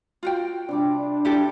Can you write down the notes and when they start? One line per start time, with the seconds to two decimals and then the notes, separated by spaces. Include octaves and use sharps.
0.23 F4 F#4 G5
0.69 C3 G3 D4 D6
1.25 E4 G4 A4